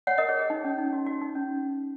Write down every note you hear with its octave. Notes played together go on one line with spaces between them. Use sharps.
C#5 F#5
A#4 D#5
G#4 C#5
G#4
D#4
C#4
D#4
F#4
F#4
D#4
C#4